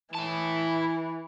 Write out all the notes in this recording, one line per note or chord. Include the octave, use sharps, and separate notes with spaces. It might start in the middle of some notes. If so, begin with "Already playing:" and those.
E3 E4 A5